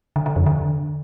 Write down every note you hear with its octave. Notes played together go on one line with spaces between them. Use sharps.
D3
D3
F2
D3